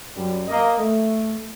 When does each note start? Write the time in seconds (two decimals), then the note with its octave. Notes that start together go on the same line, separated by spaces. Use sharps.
0.16 F#2 G3
0.48 A#3 D#5
0.78 A3